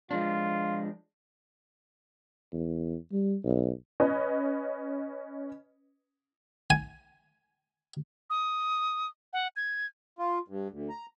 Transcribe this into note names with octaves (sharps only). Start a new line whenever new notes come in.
F3 G#3 D4 F4
E2
G3
B1
C#4 B4 D#5
G#5
D#6
F#5
G#6
F4
G2
D2
A#5